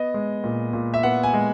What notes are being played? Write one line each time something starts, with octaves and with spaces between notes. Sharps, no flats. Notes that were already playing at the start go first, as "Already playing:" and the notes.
Already playing: B3 D#5
G#3
A#2
A#2
E5
B3 F#5
G#5
G#3